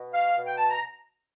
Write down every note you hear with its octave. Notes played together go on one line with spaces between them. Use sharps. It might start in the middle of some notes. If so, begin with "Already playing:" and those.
Already playing: B2
F5
B2
G5
A5
A#5